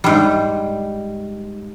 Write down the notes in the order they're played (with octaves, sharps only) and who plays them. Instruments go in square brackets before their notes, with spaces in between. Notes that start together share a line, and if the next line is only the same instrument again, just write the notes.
[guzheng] G#2 G3